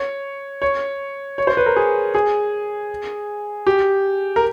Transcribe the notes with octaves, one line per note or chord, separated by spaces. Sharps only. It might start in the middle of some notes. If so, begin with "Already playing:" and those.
Already playing: C#5
C#5
C#5
C5
B4
A#4
G#4
G#4
G4
A#4